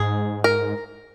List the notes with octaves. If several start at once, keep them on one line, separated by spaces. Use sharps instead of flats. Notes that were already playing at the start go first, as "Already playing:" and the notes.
Already playing: G#2 G#4
A#4